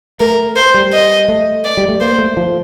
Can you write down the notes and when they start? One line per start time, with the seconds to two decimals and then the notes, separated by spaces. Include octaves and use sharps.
0.20 A3 A#4
0.56 C5
0.74 G3
0.93 D#5
1.28 A3
1.65 D5
1.77 G3
1.89 A3
2.01 A#3 C5
2.19 A3
2.37 F3